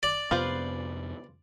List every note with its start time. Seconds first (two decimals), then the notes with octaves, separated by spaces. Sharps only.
0.03 D5
0.31 F2 C3 B3 F4 B4 C5